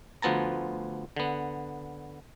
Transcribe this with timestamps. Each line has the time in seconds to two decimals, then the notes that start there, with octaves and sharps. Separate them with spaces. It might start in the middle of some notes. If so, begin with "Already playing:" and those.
0.22 D2 F3 B3 A5 A#5
1.16 D3 B3